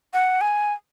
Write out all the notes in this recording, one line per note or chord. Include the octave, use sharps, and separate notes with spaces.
F#5
G#5